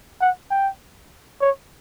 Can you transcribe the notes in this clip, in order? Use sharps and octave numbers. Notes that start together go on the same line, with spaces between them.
F#5
G5
C#5